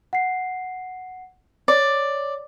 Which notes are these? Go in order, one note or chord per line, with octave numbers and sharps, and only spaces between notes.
F#5 C7
C#5 D5